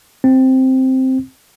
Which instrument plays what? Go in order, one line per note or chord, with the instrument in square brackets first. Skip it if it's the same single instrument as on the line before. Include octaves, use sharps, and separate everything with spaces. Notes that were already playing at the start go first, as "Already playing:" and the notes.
[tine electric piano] C4